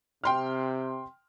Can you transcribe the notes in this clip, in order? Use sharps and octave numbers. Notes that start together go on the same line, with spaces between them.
C3 G5 C6 F6